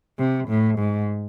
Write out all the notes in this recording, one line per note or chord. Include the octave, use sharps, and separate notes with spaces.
C3
A2
G#2